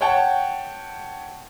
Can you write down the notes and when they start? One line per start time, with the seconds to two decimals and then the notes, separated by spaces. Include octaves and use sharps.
0.01 C#5 F#5 G5 A5